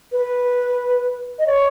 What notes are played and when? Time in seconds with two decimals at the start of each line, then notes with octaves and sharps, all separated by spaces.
0.12 B4
1.39 D#5
1.47 C#5